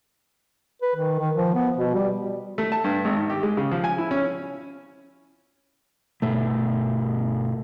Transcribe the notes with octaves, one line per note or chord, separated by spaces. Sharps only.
B4
D#3
D#3
F3
B3
B2
G3
A3
A5
G2
G#1
D#3
G4
G#3
C#3
F3
G#5
E4
C#4
G1 B2 A3